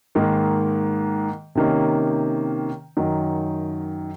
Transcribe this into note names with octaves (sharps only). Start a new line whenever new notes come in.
G#2 D#3 A#3
C3 D#3 A#3 C#4
F#2 D#3 F#3